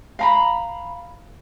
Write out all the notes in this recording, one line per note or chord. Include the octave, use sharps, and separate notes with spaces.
F5 A#5 B5